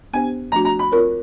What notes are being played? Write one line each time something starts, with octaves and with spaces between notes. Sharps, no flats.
B3 D4 G4 C5 G#5
F3 A3 D4 F#4 A#5
A#5
B5
C4 F4 A#4 C#5